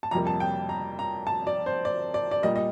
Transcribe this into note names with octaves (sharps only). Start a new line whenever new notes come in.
A5
F2 C3 G3 A#3 A#5
A5
G5
A#5
A#5
A5
D5
C5
D5
D5
D5
A#2 G3 A#3 D#5
D#5